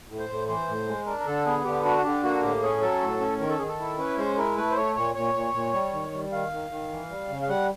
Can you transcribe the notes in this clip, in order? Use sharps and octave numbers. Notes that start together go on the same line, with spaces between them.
A2
C5
A2
E3 C5
A2
G#3
D4 A#4
A#4
D3 A4
B3 G#4
D3 G4
D4 F#4
D3 G4
A#3 F#4
A2 G4
C#4 G#4
F#3 A4
A2
C#4
D#3 A#4
A4
D#3 G#4
A4
E4
C#4 B4
G#3 C5
E4 A#4
A3 B4
C5
A3 C#5
A#2 C#5
A#2 C#5
A#2
A#2
G3
D#3
G3
D#3 F5
D#3
D#3
E3
G3
C#3
F5
G3 F#5